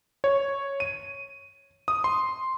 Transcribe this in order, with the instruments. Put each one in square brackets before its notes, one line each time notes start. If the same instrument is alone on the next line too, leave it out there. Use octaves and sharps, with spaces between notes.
[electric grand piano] C#5
D#7
D#6
C6